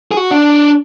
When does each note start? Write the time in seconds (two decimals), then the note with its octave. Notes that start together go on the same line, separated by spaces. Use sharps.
0.11 G#4
0.17 F#4
0.31 D4